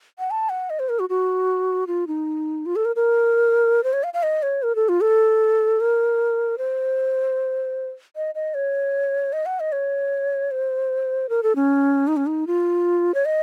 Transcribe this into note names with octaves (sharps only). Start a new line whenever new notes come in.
F#5
A5
F#5
D#5
C5
A#4
F#4
F#4
F4
D#4
F4
A4
A#4
A#4
C5
C#5
F5
F5
D#5
C#5
A#4
A4
F4
A4
A#4
C5
D#5
D#5
C#5
D#5
F#5
D#5
C#5
C5
A#4
A4
C#4
D#4
C#4
D#4
F4
C#5
D#5